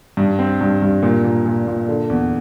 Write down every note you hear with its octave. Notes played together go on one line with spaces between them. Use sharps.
G2
C4
G2
G2
A#2
A#2
A#2
A#2
D3
E2